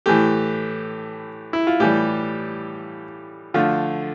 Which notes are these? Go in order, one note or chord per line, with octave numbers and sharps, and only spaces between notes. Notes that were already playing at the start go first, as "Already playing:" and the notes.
A2 E3 A3 G4
E4
F4
A2 E3 G3 G4
D3 F3 A3 F4